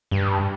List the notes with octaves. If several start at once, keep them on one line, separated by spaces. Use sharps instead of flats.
G2